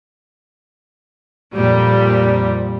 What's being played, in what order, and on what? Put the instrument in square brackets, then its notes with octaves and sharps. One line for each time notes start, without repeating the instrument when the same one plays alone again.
[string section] F2 A#2 G3